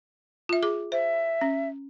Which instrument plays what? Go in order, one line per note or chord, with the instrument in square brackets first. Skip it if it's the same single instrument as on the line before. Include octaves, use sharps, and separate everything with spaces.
[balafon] F4 E5
G#4 D6
[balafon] C5 [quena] E5
[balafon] C#4